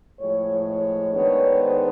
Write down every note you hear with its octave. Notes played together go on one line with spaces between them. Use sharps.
A2 F3 G#3 C#5
C#5
D#3 G#3 B3 D4 C#5
C5